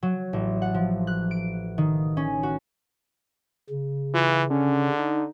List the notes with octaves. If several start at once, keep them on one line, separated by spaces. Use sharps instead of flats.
F#3
A1
F#5
F3
F#6
D7
D#3
C#4
F#4
C#3
E3 F4
D3 C#4
D#4